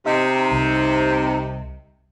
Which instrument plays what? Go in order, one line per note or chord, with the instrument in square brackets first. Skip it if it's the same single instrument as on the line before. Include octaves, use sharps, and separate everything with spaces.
[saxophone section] C3 [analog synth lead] D#4
[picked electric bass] C2